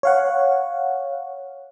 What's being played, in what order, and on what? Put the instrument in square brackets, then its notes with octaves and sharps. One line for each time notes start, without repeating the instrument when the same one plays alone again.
[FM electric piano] C#5 F5 F#5